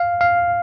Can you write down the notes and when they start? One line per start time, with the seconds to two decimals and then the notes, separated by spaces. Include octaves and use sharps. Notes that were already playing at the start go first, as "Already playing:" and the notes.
Already playing: F5
0.21 F5